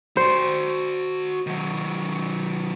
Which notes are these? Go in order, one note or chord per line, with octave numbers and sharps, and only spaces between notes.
F#4 C5 D5
D#3 F#3